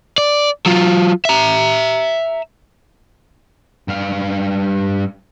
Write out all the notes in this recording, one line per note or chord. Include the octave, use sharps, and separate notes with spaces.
D5
F#3 F4
E5 A#5
G2 F5